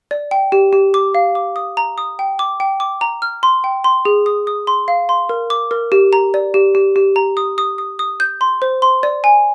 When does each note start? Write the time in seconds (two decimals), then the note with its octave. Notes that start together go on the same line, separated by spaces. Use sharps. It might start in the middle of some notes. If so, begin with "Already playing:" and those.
0.11 D5
0.31 G5
0.52 G4
0.73 G4
0.94 D6
1.15 F5
1.35 D6
1.56 D#6
1.77 A#5
1.98 D#6
2.19 G5
2.39 D6
2.60 G5
2.80 D6
3.01 A#5
3.22 F6
3.43 C6
3.64 G5
3.84 C6
4.05 G#4
4.26 D#6
4.47 D#6
4.67 C6
4.88 F5
5.09 C6
5.29 A#4
5.50 D6
5.71 A#4
5.92 G4
6.13 A#5
6.34 D5
6.54 G4
6.75 G4
6.96 G4
7.16 A#5
7.37 D#6
7.58 D#6
7.78 D#6
7.99 D#6
8.20 G6
8.41 C6
8.62 C5
8.82 C6
9.03 D5
9.24 G#5